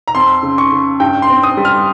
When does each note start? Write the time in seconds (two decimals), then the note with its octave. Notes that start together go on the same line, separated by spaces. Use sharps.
0.08 A#5
0.15 F2 C6
0.43 C#3
0.58 C#6
0.72 C#3
1.00 G2 G5
1.22 C6
1.30 C4
1.43 D#6
1.57 G3
1.65 F6